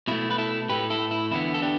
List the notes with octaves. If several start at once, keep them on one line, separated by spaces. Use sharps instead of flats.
B2 A3 E4
B4
E4 A4
A2 A3 G4 B4
E4 A4
E4
E2 D3 B3 E4
A4
D4 G4